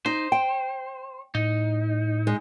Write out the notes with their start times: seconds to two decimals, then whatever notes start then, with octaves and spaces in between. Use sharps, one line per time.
0.06 D#4 C5
0.32 G5
1.35 A2 D#4
2.27 G#3